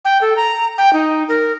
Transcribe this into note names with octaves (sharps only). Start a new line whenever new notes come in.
G5
A4
A#5
G5
D#4
A#4